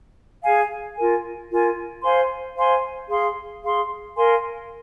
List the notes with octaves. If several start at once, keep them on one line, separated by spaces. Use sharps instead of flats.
G#4 F5 G#5
F4 A#4 G#5
F4 A#4 G#5
C5 F5 G#5 C6
C5 F5 G#5 C6
G#4 F5 C6
G#4 F5 C6
A#4 F5 G#5 C6